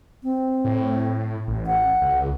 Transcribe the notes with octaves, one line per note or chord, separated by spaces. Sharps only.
C4
A2
A1
F#5
C#2